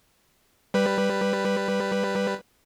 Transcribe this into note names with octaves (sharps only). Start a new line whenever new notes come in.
G3 B4